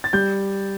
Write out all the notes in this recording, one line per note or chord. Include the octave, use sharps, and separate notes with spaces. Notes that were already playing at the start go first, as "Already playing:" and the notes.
A6
G3 G6